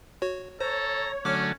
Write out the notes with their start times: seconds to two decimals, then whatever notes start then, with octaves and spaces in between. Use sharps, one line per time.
0.22 F#4 C#5
0.61 A4 C5 C#5 A#5
1.25 D3 F#3 A3 C#4 D6 F6